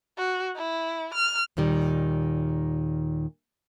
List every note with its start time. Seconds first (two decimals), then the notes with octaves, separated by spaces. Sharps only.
0.18 F#4
0.56 E4
1.14 F6
1.57 D#2 A#2 D#3 G3